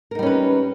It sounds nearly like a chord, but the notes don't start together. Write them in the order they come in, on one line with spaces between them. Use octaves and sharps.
A#4 D#4 G3 C#4 B4